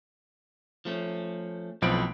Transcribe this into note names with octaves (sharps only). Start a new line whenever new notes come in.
F3 A3 C#4
B1 A2 F3 C4 B4 D7